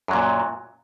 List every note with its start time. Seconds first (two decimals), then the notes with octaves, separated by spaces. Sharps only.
0.08 F#2
0.11 F#3
0.13 A#2